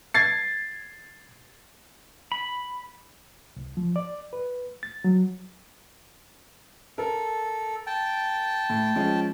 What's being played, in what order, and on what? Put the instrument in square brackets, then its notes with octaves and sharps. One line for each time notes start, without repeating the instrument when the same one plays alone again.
[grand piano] G#6 A6 C7
[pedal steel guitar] B5
[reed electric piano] C2
F3
D5
B4
A6
F#3
[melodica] A4 [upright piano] A#4
[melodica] G5 A5
[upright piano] A2
F3 G#3 C#4